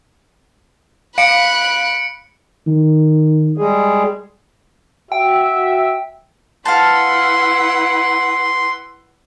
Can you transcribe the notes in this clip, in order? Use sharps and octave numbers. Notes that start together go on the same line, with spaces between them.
F5 B5 F#6 C#7 D7
D#3
G3 G#3 G#4
F#4 E5 G5
E4 B4 F5 F#5 A5 C6